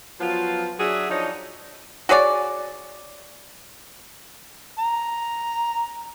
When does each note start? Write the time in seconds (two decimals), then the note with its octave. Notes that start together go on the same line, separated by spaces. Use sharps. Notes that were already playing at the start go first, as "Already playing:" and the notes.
0.20 F3 F#3 B3 F4
0.79 F#3 D4 F#4 G#4 E5
1.10 F3 D4 D#4 C#5 D#5
2.09 F#4 G#4 C#5 D5
4.79 A#5